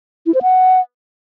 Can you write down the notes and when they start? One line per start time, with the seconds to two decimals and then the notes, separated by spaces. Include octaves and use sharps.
0.26 E4
0.34 C5
0.42 F#5